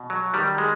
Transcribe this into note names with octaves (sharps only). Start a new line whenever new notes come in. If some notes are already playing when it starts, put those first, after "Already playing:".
Already playing: B2
F#3
D#3 G3
G#3